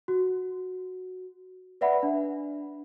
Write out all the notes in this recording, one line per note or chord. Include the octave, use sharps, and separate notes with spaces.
F#4
B4 D5 E5 F#5 B5
D4